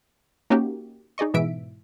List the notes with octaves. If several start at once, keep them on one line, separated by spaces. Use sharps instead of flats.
A#3 C#4 D#4 F#4 G4
D#4 G#4 D5 D#5 C#6
G#2 B2 E3 E5 B6 D7